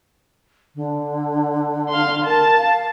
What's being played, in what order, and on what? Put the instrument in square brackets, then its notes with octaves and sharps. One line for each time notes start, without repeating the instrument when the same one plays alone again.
[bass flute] D3
[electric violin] F5 C6
[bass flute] A#4 [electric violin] A5
[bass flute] F5